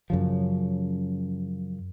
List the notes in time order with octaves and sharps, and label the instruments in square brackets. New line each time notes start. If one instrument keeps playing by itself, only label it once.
[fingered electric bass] F#2 C#3 F3